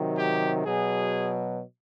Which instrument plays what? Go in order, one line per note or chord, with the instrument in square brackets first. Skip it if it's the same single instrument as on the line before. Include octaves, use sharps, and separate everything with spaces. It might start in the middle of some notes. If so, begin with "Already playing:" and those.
Already playing: [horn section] C3 D#3 F#3
G4
B2 F#3 G#4